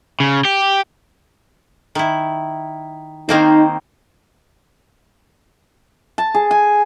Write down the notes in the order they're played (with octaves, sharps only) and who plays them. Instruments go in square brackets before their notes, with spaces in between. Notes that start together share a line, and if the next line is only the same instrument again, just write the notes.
[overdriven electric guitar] C#3
G4
[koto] D#3 E4
[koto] D#3 A#3 C4 [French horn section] D#4
[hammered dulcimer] A5
G#4
G#5